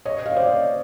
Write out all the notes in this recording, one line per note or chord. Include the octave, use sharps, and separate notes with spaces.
C#5 D#5
D#5 F5
C5 D5